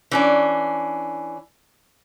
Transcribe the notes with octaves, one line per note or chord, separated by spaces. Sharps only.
E3 C#4 D4